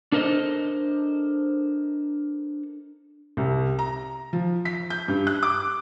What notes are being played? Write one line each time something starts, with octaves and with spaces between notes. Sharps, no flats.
D4 A4 A#4 C5 D#5
C2
A#5
F3
B6
G6
G2
F#6
D6